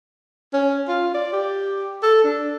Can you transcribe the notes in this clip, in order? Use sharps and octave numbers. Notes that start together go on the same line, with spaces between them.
C#4
F4
D5
G4
A4
D4